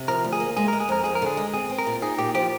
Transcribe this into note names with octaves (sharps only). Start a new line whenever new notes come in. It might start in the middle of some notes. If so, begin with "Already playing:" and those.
Already playing: C3
F3 A#4
D2
G#4
A#3
G#3 G#4
G#3 A#4
G#4
F2 A#4
F2 G#4
A#4
D3 G#4
G#3
C4 G#4
C4
A#4
A#2
D#4 G#4
A#2 G4
F3 G4